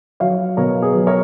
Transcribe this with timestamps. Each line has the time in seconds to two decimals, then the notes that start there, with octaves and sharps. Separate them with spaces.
0.20 F#3 C#5 F5
0.57 B2 A#4 C#5
0.82 G#4 B4
0.94 F#3
1.07 A#4 C#5